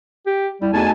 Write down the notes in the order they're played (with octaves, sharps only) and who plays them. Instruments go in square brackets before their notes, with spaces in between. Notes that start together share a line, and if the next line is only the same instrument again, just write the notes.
[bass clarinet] G4
[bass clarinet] G3 [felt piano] E4
[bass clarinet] E2 [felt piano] A3 D#4 F#4 [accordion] G#5 A5